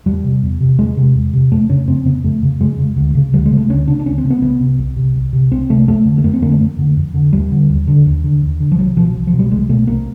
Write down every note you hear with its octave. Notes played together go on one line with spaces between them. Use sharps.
E2 G3
C3
E2
C3
E2 G#3
C3
E2
C3
F2 A3
C#3 C#4
F2 C4
C#3 B3
F2 A3
C#3
F2 G#3
C#3
D2
C#3
D2 G3
G#3
C#3
A3
D2 C#4
C#3 D4
D4
D2 C#4
C4
C#3
B3
C2 B3
C3
C2
C3
C2
C3
C2 C4
C3 A3
F2 A3
D3
A3
F2 A#3
C4
D3 A#3
A3
F2
D3
F2
D3
D#2 G3
D3
D#2
D3
D#2
D3
D#2
D3
F3
C2 F#3
B2 F3
C2
F3
B2
G3
C2 G#3
B2 A3
C2 A#3